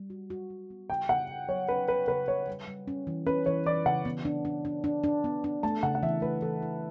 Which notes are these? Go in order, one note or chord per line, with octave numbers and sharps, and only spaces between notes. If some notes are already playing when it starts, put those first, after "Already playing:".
Already playing: G3
F#4
F#4
G3
B3
C#3 G5
C#3 F#5
C#3
F#3 C#5
C#4 B4
F#3 B4
C#3 B4
C#3 C#5
G3
G3
C#4
E3
C#4 B4
E3 C#5
E3 D5
C#3 F#5
B3
D4
D4
D4
D4
D4
B3
D4
A3 A5
C#3 F#5
F#5
E3 E5
A3 B4
E3 A4
E4